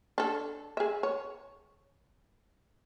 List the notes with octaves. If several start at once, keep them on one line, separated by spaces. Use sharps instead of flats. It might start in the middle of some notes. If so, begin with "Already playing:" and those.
D4 A4
G#4 E5
C#5